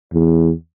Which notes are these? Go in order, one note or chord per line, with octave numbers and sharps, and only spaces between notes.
E2